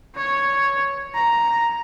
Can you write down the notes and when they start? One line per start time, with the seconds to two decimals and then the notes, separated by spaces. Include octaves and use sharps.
0.16 C#5
1.15 A#5